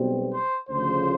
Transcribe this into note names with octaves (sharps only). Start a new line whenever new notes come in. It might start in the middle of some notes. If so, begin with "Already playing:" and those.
Already playing: B1 B2 G3 C4
C5
D2 C#3 F3 C5